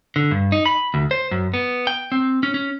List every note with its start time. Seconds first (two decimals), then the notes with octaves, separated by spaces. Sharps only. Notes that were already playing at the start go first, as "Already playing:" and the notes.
0.16 D3
0.31 G2
0.52 D#4
0.66 B5
0.94 D2
1.11 C5
1.31 F#2
1.54 B3
1.87 G5
2.12 C4
2.43 C#4
2.54 C#4